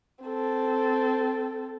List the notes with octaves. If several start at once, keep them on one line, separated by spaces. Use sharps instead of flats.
C4 A4